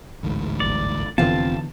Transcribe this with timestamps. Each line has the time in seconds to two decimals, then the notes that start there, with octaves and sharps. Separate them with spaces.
0.23 A1 D2 G#2
0.60 G1 D5
1.18 F1 D3 E3 B3 C4 F4 A5